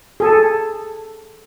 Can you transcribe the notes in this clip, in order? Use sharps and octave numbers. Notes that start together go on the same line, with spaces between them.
G#4 A4